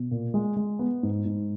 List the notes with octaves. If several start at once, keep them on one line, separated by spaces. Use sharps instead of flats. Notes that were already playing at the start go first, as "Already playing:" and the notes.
Already playing: B2
A#2
G#3
G#3
B3
G#2
G#2